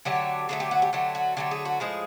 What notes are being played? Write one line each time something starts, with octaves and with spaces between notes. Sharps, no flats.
D3 F#3 A3 G4
D3 F#3 A3 G#4
G4
F#4
G4
D3 F#3 A3 G4
F#4
D3 F#3 A3 G4
G#4
F#4
A2 F3 G#3 G#4